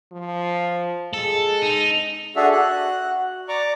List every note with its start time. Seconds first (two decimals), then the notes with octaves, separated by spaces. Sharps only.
0.12 F3
1.13 G#3 A4
1.62 D#4
2.36 D4 F#4 G#4 A4 E5
2.52 F#4 F#6
3.48 D5 A#5 C#6 D6